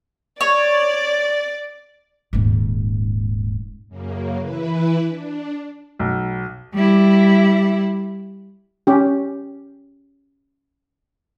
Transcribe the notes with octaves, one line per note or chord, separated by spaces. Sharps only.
C#5 D5
D#1 G#2
F#2 C#3 A#3
E3 E4 B4
D4
B1
G3 E4
C#4 G4